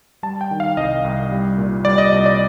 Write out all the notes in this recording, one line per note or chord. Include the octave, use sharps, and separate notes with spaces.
G3 A5
G5
D#3
F5
C2 D#5
C2
G3
A#2
G3 D5
D#5
C2 D#5
D5